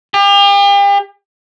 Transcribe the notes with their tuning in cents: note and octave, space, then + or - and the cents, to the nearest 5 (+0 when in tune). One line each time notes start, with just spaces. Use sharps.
G4 +40